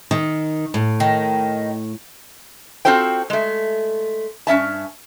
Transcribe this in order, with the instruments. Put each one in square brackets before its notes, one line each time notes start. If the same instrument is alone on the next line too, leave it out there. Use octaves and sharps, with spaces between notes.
[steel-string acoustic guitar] D#3
A2
[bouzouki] D#3
[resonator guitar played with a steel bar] C4 F4 F#4 A4 C5 G5
G#3 A3
G2 C#4 E5 A5